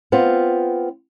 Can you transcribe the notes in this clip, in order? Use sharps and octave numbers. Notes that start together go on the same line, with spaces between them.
B3 C4 F4